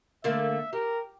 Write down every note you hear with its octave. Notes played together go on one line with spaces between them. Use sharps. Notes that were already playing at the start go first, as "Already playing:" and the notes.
D3 A3 A#3 E5
G4 A#4